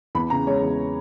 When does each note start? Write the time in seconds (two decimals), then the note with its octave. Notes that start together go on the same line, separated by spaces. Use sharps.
0.15 E2 B5
0.30 C#3 A#5
0.47 G#3 C#5
0.62 E2